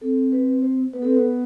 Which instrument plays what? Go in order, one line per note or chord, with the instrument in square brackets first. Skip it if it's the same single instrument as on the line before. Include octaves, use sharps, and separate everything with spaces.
[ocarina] C4 [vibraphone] A4
[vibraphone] B4
C5
[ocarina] B3 [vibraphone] B4
[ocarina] C4 [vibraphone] A4
[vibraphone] B4
[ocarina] B3